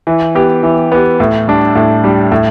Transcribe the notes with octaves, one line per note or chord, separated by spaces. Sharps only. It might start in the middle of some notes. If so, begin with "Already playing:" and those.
E3
B3 G4
E3
B3 G4
A2
G3 D4
A2
G3 D4
A2